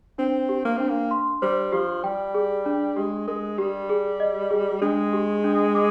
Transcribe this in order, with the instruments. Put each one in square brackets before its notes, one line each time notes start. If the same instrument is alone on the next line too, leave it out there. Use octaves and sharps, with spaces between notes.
[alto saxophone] C4 [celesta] D4
[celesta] G4
[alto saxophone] A#3
[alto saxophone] C4 [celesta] D4
[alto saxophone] A#3
[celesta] C6
[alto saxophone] G3 [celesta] C5
[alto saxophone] F3 [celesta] G4
[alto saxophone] G3 [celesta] G5
[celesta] G#4
D4
[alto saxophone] G#3 [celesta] G4
[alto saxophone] G#3 [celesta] A#4
[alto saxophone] G3 [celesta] G4
[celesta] G#4
D#5
G#4
[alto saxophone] G#3 [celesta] D4
[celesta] G4
D4
D6